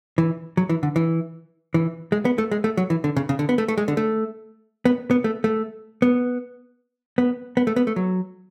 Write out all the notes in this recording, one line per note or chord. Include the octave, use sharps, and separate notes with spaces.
E3
F#3
E3
D3
E3
E3
G#3
B3
A3
G#3
A3
F#3
E3
D3
C#3
C#3
D3
B3
A3
A3
G#3
D3
A3
B3
B3
A3
A3
B3
B3
B3
A3
B3
A3
F#3